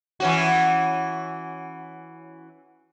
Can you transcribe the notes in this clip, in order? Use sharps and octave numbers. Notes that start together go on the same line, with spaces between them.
E3 C#4 F#4